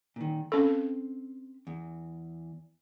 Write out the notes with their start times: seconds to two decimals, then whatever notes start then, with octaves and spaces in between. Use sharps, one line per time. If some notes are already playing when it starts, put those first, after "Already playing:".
0.16 A#2 D#3
0.52 C4 C#4 A4 F5 B5
1.67 E2